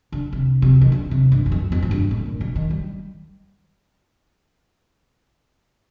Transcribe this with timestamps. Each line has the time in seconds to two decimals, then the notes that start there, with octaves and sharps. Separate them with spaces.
0.12 D3
0.33 C3
0.62 C3
0.82 D#3
0.92 D3
1.11 C3
1.32 G2
1.46 G2
1.52 F2
1.72 F2
1.82 A2
1.91 G2
2.11 A2
2.25 A#2
2.41 D3
2.55 D#3
2.70 G3